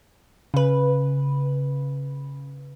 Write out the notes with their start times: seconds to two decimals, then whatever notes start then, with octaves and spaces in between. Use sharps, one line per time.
0.54 C#3 B4